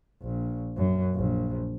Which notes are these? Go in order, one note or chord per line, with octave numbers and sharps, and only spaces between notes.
A#1
F#2
A#1